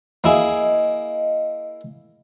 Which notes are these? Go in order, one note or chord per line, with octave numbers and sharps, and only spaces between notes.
A#3 E4 G#4 D#5